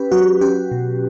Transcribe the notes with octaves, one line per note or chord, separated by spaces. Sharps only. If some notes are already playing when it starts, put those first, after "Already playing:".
Already playing: C#4 G4 B4
F#3 F#4
C#4 G4
B2